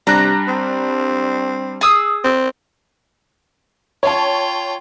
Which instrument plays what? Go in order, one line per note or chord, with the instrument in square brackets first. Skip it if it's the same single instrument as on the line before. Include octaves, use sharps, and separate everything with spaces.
[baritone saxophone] C3 [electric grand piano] G3 D4 F#6 [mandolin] A#5
[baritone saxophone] C4
[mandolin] G#4 D#6 E6
[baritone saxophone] C4
[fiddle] F4 G5 [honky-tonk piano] C#5 A5